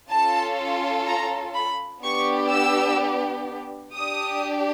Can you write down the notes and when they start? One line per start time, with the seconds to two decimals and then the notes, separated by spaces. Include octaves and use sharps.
0.10 C#4 F4 A4 A5
1.07 A#5
1.55 B5
2.03 B3 D4 G4 C#6
2.51 E6
3.94 D4 G4 D#6